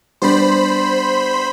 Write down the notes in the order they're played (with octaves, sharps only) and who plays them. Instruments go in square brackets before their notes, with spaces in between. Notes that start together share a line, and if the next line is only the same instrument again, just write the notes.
[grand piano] G3 B3 D4 [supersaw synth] C5 B5